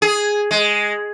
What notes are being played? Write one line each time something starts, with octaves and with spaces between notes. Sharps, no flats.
G#4
G#3